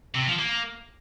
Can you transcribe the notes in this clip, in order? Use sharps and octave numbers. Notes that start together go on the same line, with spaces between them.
C3
F3
A#3